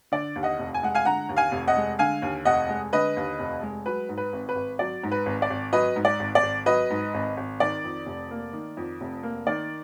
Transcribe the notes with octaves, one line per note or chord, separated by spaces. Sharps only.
D3 D5
D#2
D#5 F#5
F1
G#5
G#3 F#5
F5 G#5
D3 F#5 A#5
D#2
F5 G#5
F1
D#5 F#5
G#3
D3 F5 G#5
D#2
F1 D#5 F#5
G#3
D3 B4 D#5
D#2
F1
G#3
F#3 B4
G#2
B4
G#1
B4
G#1
F#3 D5
G#2
B4
G#1
D5
G#1
F#3 B4 D#5
G#2
D5
G#1
D5
G#1
F#3 B4 D#5
G#2
G#1
G#1
D#3 D5
F2
F1
A#3
D#3
F2
F1
A#3
D#3 D5